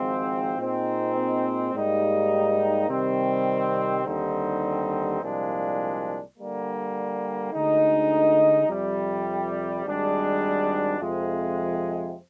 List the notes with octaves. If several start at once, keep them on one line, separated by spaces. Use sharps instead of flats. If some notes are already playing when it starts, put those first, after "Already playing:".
Already playing: G#1 G#2 F3 C4
A#2 G#3 C4 D#4
G#2 G3 A#3 D#4 G4
C3 D#3 G3 C4
D#2 D3 G3 C4 D#4
C2 A#2 F3 G#3 D4
D3 G3 A#3
D2 D3 G#3 D#4
F2 C3 G3
G#1 G#2 G3 D4 G#4
F2 C3 F3 G#3